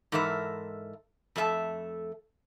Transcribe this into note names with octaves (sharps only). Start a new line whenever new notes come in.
G#2 E3 A4 A#4 E5
F2 A3 A4 E5 A5